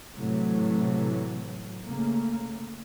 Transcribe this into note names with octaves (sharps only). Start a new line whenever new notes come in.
A2 C3 E3 F#3 A3
C#3 A3 A#3